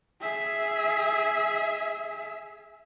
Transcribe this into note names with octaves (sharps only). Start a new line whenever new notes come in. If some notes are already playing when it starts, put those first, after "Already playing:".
G#4 E5